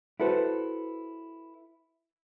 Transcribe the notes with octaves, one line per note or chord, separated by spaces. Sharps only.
E4 F#4 A4 B4 C5